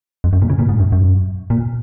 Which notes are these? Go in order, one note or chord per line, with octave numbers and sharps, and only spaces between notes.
F2
F#2
A#2
C#3
A#2
G#2
F#2
F#2
A#2